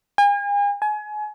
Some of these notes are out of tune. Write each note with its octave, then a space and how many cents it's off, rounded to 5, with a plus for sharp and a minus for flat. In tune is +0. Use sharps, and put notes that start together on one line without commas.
G#5 -40
G#5 +30